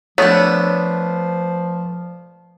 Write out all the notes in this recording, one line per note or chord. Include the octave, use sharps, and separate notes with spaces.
F3 A3 B3 D4 C#5